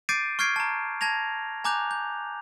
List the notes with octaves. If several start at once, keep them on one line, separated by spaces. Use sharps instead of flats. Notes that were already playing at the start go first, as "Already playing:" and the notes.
D6 G6 A6 C7 D7 D#7
C#6 F6 G6 G#6 C7 D7
A5 A#5
A5 G#6 A#6 F7
G#5 A#5 D6 F#6 G6 F7
G6